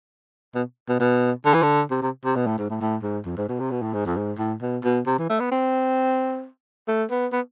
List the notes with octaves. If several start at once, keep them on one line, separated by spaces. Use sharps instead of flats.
B2
B2
B2
D3
E3
D3
C3
C3
C3
B2
A2
G#2
A2
A2
G#2
F2
G#2
B2
C3
B2
A2
G#2
F2
G#2
A2
B2
B2
C3
E3
A3
B3
C4
A3
B3
B3